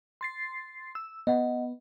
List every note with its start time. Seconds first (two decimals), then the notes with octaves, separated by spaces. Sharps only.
0.21 C6 A6 C7
0.95 E6
1.27 B3 D#5 F#5